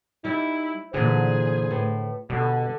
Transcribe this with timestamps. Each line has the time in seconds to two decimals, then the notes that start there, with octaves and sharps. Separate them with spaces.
0.25 G3 D#4 E4
0.94 A#2 D3 E3 G#4 C5
1.71 A2 B4
2.30 B2 D3 G3